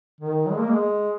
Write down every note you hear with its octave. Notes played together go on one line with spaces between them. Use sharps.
D#3
F#3
G#3
A#3
G#3